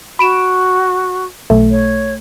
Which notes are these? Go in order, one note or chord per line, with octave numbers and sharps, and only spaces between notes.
F#4 B5 D7 E7
B1 A3
C#5